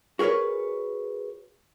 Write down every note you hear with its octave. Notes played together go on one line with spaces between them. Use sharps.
F#4 G#4 A#4 B4 C#5